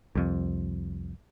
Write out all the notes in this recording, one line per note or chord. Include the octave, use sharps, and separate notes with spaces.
C2 F2